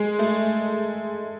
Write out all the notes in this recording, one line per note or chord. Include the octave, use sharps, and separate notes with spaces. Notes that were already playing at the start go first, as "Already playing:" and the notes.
Already playing: G#3
A3